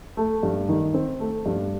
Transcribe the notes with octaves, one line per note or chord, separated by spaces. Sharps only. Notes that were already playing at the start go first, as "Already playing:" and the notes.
A3
G2
D#3
C4
A3
G2